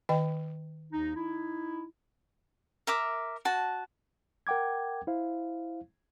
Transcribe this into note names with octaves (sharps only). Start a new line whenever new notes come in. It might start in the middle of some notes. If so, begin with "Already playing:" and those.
D#3 D#5 G5
D#2 D#4
D#4 E4
A#4 E5 D6
F#4 A5
A#4 F#5 G5 D6 G#6
E4 C5 F5